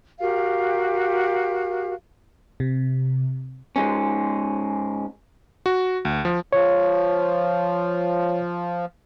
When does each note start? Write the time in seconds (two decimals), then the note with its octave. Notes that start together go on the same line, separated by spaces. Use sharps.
0.19 F#4 G4 A#4 F5
2.60 C3
3.76 G#2 G#3 C#4
5.66 F#4
6.05 D2
6.25 F3
6.53 F3 C#5